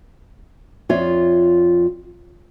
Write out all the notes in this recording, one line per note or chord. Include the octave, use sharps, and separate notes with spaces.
F2 F4 C#5 D5 E5